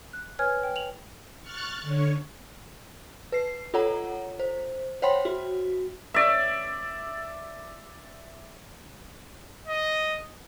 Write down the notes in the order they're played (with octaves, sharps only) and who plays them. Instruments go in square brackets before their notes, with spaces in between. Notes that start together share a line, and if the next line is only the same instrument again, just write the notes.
[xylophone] F#6
B4 C#5 G#5 F6 G#6
G5
F7 F#7
[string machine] C#6 F6 F#6 A6 C#7
D3 C#5
[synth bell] B4 C7
F4 A4 C#5 F#5 A#5
C5
C5 C#5 F#5 G5 B5 C6
F#4
[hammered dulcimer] D5 E5
[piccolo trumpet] D#5